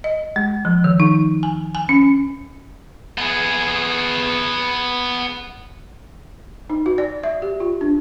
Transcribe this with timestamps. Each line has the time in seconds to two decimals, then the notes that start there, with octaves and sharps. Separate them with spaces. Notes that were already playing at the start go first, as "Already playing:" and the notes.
0.04 D#5
0.36 G#3
0.65 F3
0.84 D#3
1.00 D#4
1.43 G#5
1.75 G#5
1.89 C#4
3.18 B3 G#4
6.70 D#4
6.86 F#4
6.98 D5
7.23 E5
7.42 G4
7.60 F4
7.81 D4